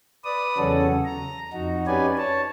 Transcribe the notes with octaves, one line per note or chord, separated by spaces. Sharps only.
B4 D5 D#6
E2 C#3 F#3 C#4 F#4 A4
A#5
F2 D#4 F#4
C#4 D#4 G4 B4 D5 G#5
C#5 A5